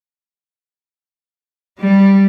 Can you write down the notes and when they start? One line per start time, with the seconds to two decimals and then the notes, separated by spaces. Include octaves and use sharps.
1.80 G3